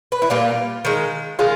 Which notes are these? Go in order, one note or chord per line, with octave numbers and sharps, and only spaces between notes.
B4
E4
A#2 G3 A#3 F4
D#3 G#3
D#3 G#3 F4